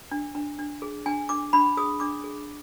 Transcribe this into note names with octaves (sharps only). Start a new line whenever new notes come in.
D4
D4
D4
G#4
D4 G#5
D4 D6
D4 B5
G#4 D#6
D4 D6
G#4